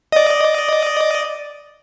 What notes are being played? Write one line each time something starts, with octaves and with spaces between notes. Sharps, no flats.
D5 D#5